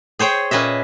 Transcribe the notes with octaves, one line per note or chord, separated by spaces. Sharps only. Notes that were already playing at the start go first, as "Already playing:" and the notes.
G#4 C5 C#5 G5
A#2 C#4 B4 D#5 E5